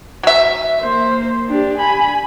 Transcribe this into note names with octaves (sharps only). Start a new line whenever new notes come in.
F#3 E5
A#3 C5
D4 G4
G#5 B5